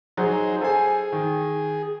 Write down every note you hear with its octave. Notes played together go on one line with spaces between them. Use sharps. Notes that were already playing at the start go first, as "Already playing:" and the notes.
F#3 D#4 G#4 C5
G#4 A4 C5 G#5
D#3